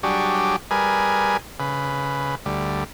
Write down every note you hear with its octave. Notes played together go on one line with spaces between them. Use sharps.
F#3 G3 D4 G4 G#4 C#5
G3 G#4 A#4 B4 G#5
C#3 B4
D2 G3